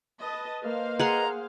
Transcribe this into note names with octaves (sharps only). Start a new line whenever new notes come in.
B4 D#5 A5
A#3 B4 C5 D#5 F5
G#4 F#5 A#5 C6